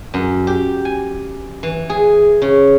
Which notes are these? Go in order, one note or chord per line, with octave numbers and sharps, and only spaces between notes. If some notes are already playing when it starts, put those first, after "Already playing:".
F#2
G4
G#5
E3
G#4
C#3